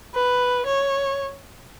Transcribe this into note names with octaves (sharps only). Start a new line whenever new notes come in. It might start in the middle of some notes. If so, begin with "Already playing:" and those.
B4
C#5